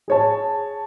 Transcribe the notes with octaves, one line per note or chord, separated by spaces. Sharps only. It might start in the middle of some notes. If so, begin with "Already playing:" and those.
G#4 C#5 A5